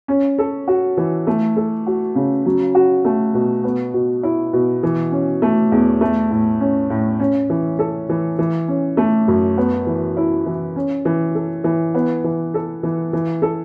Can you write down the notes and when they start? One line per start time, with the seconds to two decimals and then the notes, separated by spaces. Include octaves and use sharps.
0.08 C#4
0.38 A4
0.68 F#4
0.97 E3
1.27 A3
1.57 A4
1.87 F#4
2.15 C#3
2.46 F#3
2.75 F#4
3.05 A3
3.34 B2
3.64 B3
3.94 B2
4.23 E4
4.53 B2
4.83 E3
5.12 C#4
5.42 A3
5.72 E2
6.01 A3
6.31 A2
6.60 C#4
6.90 A2
7.20 C#4
7.50 E3
7.79 A4
8.09 E3
8.39 E3
8.68 C#4
8.97 A3
9.28 F#2
9.58 B3
9.87 E3
10.17 E4
10.46 E3
10.76 C#4
11.05 E3
11.35 A4
11.64 E3
11.94 B3
12.24 E3
12.54 A4
12.83 E3
13.13 E3
13.42 A4